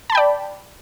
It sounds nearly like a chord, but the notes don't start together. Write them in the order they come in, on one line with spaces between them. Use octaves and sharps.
A5 B5 G5 D5